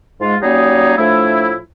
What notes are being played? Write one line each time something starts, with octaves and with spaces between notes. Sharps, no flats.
G#2 G#3 F4
F#3 G3 A#3 C#4 D#4 G#4
A2 F3 A3 D4 E4